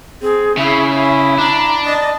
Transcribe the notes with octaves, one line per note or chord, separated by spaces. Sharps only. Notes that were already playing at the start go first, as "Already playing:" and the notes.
C4 G#4
C#3 E4 E5
E4
D4 A#5
D5 D#5 A5